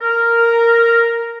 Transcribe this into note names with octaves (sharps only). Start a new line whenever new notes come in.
A#4